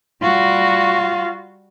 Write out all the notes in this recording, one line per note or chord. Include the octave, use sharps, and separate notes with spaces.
G3 F4 F#4